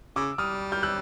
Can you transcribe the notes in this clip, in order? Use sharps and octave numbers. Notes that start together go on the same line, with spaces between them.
C#3 D6 E6
G3 D#6 F6
F6 G6
E6 F#6